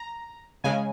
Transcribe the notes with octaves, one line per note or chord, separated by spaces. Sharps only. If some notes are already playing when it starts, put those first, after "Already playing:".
Already playing: A#5
C#3 G#3 G#5